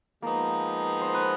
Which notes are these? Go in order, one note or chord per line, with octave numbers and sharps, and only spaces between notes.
F3 G#3 A#3 B3 D#4 A#4
C5
B4